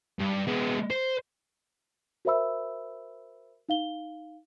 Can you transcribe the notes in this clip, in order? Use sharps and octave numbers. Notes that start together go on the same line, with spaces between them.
G2
G#3 B3
C5
F#4 A#4 C5 E5 B5 E6
D#4 F5 G7